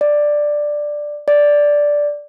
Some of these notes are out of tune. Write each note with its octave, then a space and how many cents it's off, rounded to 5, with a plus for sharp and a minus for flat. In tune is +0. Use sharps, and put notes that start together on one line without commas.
D5 +5
D5 -5